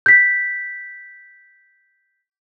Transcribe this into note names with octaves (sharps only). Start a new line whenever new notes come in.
G6 B6